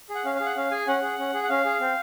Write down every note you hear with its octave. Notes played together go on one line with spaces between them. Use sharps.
G#4
F#5
C#4 F5
G#4 F5
F#5
C#4 F5
G#4 G#5
C#4 F#5
G#4
C#4
G#4
F#5
C#4 F5
G#4
C4